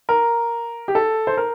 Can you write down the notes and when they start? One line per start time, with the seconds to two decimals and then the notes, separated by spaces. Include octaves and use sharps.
0.09 A#4
0.88 G4
0.95 A4
1.27 C5
1.37 A#4